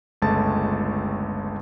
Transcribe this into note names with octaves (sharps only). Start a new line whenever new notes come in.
G1 C#2 G#3 A3 A5 A6